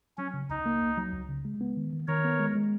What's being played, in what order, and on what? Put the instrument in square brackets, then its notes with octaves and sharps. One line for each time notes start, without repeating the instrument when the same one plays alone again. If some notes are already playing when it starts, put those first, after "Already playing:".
[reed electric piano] F#3 [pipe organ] C#4
[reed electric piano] C#3
[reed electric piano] C#2 [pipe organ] D#4
[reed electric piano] A#3
C#2
F#3
C#2
C#3
G#3
B3
D#3
D#3
[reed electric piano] D#3 [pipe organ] A#4 C#5
[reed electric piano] B3
G#3
G#3